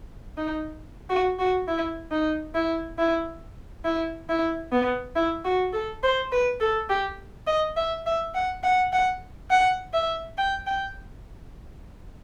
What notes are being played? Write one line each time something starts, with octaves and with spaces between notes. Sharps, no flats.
D#4
F#4
F#4
E4
D#4
E4
E4
E4
E4
B3
E4
F#4
A4
C5
B4
A4
G4
D#5
E5
E5
F#5
F#5
F#5
F#5
E5
G5
G5